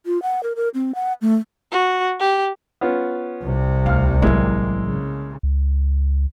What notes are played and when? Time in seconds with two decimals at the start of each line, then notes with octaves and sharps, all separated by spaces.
0.06 F4
0.22 F#5
0.43 A#4
0.56 A#4
0.74 C4
0.95 F#5
1.22 A3
1.72 F#4
2.20 G4
2.81 B3 C#4 F4
3.42 C2 C3
3.86 D2 F5 F6
4.22 A1 F#3 G#3 A#3 E4
4.85 C#3
5.43 C#2